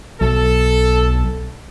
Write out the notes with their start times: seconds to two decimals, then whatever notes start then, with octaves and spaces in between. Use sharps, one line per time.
0.21 B1 A4